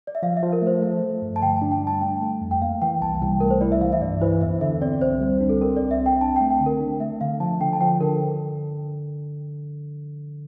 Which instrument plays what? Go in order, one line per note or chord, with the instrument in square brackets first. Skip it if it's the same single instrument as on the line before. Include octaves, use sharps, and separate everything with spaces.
[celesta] D5
E5
[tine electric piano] F3 [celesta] F5
[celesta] E5
[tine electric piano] F3
[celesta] A#4
[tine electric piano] A3 [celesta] C5
[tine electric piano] A3
F3
G2
[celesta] A5
[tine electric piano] D3 [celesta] G5
[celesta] A5
[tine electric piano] D4
[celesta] G5
[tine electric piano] G3 [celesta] A5
[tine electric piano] A3 [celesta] G5
[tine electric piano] A3
F2
[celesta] G5
[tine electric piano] A#3 [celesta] F5
[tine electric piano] E3 [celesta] G5
[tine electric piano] C2 [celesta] A5
[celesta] A5
[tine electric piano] C2 [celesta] G5
[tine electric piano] A3 [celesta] A#4
[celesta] C5
[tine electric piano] E4 [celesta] D5
[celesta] E5
[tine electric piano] E3 [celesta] F5
[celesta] E5
[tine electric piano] G2 [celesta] D5
[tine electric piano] E3 [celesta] C5
[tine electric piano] E2 [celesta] E5
[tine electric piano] D3 [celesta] E5
[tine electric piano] C4 [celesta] D5
[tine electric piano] C2 [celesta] C5
[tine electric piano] G3
D4
[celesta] A4
[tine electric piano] C4 [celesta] A#4
[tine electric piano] C2 [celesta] D5
[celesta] E5
[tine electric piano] C4 [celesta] G5
[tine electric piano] D4 [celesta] A5
[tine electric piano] A3 [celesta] G5
[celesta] G5
[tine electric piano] D3
[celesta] A#4
[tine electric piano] D4
[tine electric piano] A3 [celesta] E5
[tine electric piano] D3 [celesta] F5
[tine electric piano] F3 [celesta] A5
[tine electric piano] D3 [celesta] G5
[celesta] A5
[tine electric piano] F3 [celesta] G5
[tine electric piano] D3 [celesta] A#4